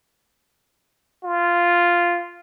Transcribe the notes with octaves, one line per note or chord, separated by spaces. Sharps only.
F4